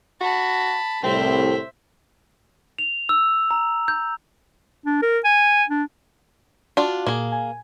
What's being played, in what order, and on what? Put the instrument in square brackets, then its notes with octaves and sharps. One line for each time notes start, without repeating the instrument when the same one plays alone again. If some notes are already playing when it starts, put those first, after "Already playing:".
[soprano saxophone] F#4 [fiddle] A5 B5
[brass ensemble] C2 A2 [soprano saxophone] C4 [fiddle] C5 E5
[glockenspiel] F7
E6
A#5
G6
[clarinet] D4
A#4
G#5
D4
[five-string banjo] D4 F4 [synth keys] F#4 A5
[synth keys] A#2 [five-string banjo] A#3 G#4
[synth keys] G#5